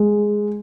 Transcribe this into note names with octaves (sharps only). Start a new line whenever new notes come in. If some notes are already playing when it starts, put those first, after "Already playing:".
Already playing: G#3